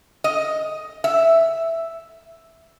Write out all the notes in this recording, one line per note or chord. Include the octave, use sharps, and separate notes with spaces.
D#5
E5